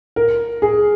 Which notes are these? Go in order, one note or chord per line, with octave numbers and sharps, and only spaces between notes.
A#4
G#4